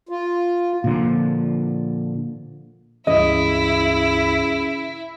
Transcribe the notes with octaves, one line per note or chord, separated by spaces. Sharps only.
F4
A#2 D3 F3
C#2 G2 C#3 E3 E4 D#5